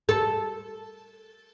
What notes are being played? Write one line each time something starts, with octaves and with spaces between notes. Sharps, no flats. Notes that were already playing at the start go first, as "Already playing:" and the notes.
A4